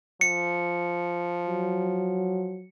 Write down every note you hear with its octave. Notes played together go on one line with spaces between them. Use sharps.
F3 C#7
F#3